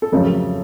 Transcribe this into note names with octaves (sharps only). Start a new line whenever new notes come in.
A4
F2 C#3 F#3 A3 A#4